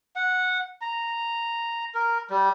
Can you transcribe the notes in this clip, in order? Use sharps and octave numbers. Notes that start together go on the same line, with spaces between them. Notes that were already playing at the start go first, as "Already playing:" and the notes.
F#5
A#5
A#4
G3